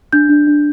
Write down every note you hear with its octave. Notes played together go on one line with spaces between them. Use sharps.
D4 G6
D4
D4